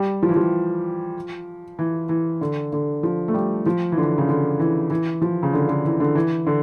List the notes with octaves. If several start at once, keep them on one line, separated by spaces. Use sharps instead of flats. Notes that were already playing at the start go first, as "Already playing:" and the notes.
Already playing: G3
F3
E3
F3
E3
E3
D3
D3
F3
A3
G3
F3
E3
D3
C#3
D3
E3
E3
F3
C#3
D3
D3
E3
D3
E3
D3